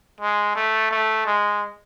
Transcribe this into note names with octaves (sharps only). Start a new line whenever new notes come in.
G#3
A3
A3
G#3